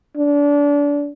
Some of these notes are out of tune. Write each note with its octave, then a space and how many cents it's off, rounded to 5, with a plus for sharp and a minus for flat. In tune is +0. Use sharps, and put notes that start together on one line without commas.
D4 -30